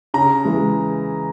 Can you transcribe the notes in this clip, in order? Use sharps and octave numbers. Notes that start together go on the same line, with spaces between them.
C#3 A#5
E3 G#3